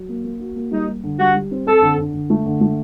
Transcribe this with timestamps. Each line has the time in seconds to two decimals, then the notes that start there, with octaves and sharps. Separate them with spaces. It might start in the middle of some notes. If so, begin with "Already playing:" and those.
Already playing: F#3
0.09 A#3
0.24 A#3
0.40 F#4
0.56 A#3
0.71 G3 D#4
0.88 G3
1.04 D3
1.18 G3 F#4
1.35 G3
1.51 C4
1.66 C4 A4
1.82 D3
1.98 D3
2.14 D3
2.30 A3
2.46 D3
2.61 A3